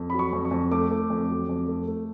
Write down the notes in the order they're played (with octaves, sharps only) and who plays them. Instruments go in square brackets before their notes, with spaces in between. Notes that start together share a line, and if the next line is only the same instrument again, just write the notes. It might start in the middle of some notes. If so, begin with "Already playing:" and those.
Already playing: [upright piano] F2
F#3 B5
C#6
F2
C#6
F2
A3 D6
A3
F2
F#3
F2
A3
A3